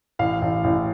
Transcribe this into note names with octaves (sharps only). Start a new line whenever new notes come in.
A1 F5
A1
A1